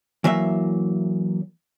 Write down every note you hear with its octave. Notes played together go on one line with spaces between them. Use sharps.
E3 F#3 A#3 E5